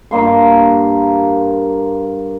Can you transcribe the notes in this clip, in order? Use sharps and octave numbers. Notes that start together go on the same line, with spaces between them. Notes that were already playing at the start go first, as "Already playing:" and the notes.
G2 A#3 C6